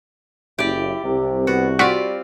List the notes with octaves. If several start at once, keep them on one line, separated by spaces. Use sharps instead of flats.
F#1 E4 G4 D5
C2 C3
B3 F#4
G3 C4 F4 F#4 D5 C#6 B6